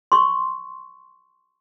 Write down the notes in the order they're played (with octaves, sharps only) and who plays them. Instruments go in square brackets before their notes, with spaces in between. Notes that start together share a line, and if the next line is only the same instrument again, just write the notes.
[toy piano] C6 C#6